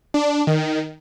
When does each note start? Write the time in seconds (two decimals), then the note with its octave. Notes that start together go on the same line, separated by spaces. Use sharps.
0.14 D4
0.47 D#3